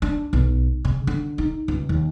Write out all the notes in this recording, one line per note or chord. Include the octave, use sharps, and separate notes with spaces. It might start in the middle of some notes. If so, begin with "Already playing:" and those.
D4
B1
C#3
D3
D#4
C#2
D#2